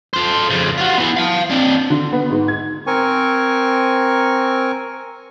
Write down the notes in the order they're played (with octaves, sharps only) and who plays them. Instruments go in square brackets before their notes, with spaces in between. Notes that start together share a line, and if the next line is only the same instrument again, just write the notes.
[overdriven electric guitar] A4 C5
F2 C#3
F4 F#4
E3 B3
F5 A5
C4 D4
[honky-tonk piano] D3
B3
G#2
G#6
[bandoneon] C4 A#4 G#5 C#6